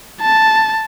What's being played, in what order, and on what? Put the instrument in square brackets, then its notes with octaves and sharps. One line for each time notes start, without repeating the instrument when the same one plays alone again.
[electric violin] A5